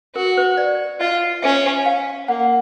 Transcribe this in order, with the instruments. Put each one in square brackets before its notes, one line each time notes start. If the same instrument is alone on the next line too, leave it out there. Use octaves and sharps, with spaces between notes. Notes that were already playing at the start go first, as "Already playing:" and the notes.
[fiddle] F#4 [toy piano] A#4
[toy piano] B4
D5
[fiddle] F4 [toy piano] D#5
[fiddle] C#4 [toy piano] E5
[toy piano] F5
[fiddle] A#3 [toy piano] F#5